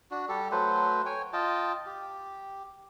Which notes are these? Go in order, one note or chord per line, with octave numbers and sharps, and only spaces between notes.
D4 F#4
G3 G4 A4
F#3 A3 B4 C5
C#5 G5 G#5
F4 D#5 G5 A5
G4